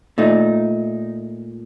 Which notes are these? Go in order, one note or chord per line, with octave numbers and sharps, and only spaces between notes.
A#2 A3 D#4